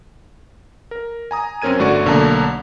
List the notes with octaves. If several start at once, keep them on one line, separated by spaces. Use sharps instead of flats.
A#4
G#5 A#5 D#6
F#2 C4 C#4 A#4 G#6 D#7
G1 D3 A3 F#4 D5 C#6
B1 D3 A3 A#3 A5 A#5